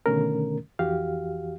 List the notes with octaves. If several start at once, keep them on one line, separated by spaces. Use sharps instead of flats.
B2 D3 D#3 A3 C#4 A#4
F2 E3 F#4 G4 F5